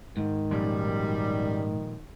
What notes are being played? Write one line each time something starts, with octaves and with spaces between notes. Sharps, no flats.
G#2 D#3
F#2 A#2 F3 G3 G#3